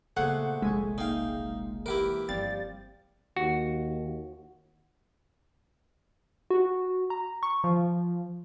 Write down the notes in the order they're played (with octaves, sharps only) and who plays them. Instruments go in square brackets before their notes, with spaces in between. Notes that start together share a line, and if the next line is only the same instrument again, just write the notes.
[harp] A#2 G#4 C5 [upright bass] C#3 B3 [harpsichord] A3 [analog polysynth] F#5
[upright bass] F1 B1 [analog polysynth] G#3 [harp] E5 G#5 C#6
[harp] A#3 G5 [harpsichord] D#4 F5
[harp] E3 [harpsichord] E4 G4 A#4
[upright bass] G1 [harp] F3 G3 C4 [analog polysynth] A6
[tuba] D#2 [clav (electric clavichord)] F#4
[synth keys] F#4
A#5
C#6
F3